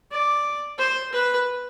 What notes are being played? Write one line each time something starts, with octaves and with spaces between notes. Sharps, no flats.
D5
C5
B4